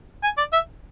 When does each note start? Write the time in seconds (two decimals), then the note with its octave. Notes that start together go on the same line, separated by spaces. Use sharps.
0.24 G#5
0.38 D5
0.53 E5